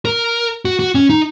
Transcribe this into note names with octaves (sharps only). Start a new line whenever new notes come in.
A#4
F#4
F#4
C#4
D#4